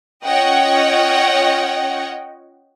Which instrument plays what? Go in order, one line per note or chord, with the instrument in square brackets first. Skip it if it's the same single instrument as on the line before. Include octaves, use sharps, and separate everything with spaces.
[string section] C#4 F4 C#5 D#5 F#5 G5